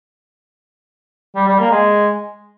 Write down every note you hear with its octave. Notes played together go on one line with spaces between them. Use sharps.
G3
G3
A#3
G#3